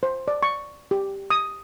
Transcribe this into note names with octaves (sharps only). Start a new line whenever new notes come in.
C5
D5
C#6
G4
D#6